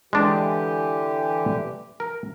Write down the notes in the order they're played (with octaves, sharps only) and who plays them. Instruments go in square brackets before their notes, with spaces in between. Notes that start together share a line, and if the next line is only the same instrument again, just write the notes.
[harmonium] D3 E3 G4 [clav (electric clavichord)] G#3 D4
[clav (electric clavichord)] A#4